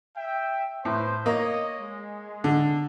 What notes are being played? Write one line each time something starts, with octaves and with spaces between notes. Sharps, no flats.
E5 G5
A2 B4 C5
A#3 C#5 D#5
G#3
D3